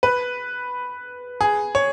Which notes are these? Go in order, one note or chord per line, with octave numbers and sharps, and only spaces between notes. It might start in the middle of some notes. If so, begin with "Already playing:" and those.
B4
G#4
C#5